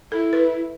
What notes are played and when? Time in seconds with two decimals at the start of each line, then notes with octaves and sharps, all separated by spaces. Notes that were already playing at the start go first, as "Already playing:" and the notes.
0.12 E4 A4
0.33 B4